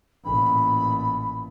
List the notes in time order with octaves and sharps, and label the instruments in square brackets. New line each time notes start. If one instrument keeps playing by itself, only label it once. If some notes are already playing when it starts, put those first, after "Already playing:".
[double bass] A1 A#2 [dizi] B5